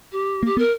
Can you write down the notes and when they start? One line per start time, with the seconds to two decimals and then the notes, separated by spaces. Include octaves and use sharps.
0.12 G4
0.43 A#3
0.46 G4
0.57 B3 A#4